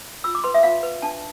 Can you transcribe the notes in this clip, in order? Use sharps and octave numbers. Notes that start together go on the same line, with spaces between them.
F4 E6
D6
B4 C6
E5
F4 F5
B4
D4 A5